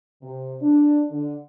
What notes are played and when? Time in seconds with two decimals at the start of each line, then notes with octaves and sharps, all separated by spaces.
0.22 C3
0.61 D4
1.10 D3